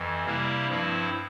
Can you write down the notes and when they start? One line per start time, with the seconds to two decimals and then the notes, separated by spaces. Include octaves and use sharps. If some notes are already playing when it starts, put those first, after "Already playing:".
Already playing: F2 E3
0.25 C3 G3 A#3 E4
0.67 G2 F3 C4 E4